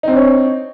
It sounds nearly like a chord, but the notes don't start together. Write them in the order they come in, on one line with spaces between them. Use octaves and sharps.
D#4 C4 D4 C#5